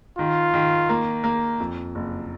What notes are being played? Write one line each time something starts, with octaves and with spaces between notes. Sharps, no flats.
D#3 F4
D#3
A#3
A#3
F2
F#1